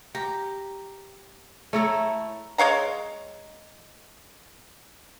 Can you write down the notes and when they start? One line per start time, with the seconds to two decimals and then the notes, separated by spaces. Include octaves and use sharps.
0.15 G4 A#5
1.73 A3 E4 A4 C#5 A#5 C#6
2.58 G#3 C#5 F5 A#5